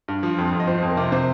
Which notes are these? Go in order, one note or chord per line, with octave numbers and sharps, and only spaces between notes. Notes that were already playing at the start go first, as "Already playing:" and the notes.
G2
F3
F2
F2
D#5
F3 C5
F2
A#4
C3
C3 C5